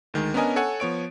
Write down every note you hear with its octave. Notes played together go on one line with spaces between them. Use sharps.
D2 D#3 G#3
B3 C#4 D4 A#4 D#5 G#5
A4 C#5 F#5 G#5
F3 B3 C#5 D7